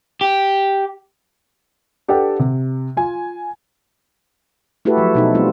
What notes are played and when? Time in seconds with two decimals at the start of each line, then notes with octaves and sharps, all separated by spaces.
0.21 G4
2.08 D4 G4 A4 B4 F#5 G5
2.39 C3
2.97 F4 G#5
4.85 A3 E4 F#4 G4 A4 B4
4.97 F3 F#3
5.15 B2 D#4 A4
5.35 G3 A3 C4 F4